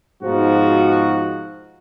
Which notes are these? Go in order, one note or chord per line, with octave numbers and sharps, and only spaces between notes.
G#2 B2 F3 D#4 F#4